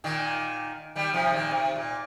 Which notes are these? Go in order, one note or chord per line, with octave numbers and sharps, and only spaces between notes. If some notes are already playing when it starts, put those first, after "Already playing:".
A#2 D#3
D#3 G3
C3 F3
A#2 D#3
C3
A#2